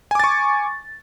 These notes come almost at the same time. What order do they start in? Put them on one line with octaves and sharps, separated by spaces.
G#5 D6 A6 C#6